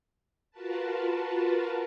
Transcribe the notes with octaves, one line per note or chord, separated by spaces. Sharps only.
F4 F#4 A#4 B4 A5